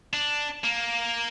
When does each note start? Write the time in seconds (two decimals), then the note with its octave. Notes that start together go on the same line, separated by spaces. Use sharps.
0.13 D4
0.64 A#3